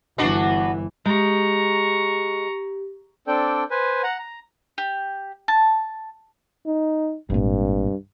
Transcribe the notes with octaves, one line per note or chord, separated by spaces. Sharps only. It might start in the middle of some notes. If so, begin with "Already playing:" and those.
G1 E3 B3 D4 F#4
G#3 G4 A#5 C#6
C4 D4 A4 D5 G5
B4 C5 G#5
F#5 A#5
A#5
G4
A5
D#4
G#1 G2 A#2